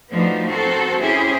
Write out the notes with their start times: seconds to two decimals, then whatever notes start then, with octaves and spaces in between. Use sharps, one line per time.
0.11 F3 A3 B3 D4 D#4 F#4
0.47 C4 F#4 A4 A#4 C5
1.00 C#4 E4 G4 G#4 C5